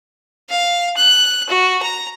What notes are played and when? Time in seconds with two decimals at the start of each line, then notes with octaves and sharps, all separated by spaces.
0.49 F5
0.96 F#6
1.49 F#4
1.83 A#5